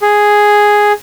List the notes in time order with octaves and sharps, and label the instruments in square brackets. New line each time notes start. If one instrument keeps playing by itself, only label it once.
[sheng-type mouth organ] G#4